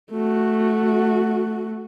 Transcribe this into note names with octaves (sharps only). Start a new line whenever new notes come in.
A3 F#4